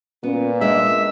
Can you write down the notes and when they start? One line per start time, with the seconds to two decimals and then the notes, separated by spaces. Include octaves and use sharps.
0.23 A#2 B3 C#4
0.61 G#3 D4 D#5 E5